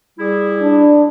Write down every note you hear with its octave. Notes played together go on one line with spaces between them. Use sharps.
G3 E4 G#4
D4